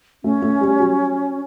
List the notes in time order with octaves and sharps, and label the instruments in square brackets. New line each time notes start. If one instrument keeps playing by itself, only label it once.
[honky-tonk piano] A3 [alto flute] C#4
[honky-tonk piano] A3
G3
F#3